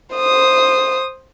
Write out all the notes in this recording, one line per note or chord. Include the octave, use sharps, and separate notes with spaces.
C5 D#6